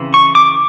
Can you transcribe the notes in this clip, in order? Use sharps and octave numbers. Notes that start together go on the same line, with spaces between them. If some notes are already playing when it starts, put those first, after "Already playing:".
Already playing: C#3 E3 C4
C#6
D6